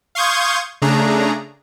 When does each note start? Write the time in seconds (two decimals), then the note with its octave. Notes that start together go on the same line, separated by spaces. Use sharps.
0.15 F5 C6 C#6 D#6 G6 G#6
0.82 C#3 A3 D4 G#4 A#5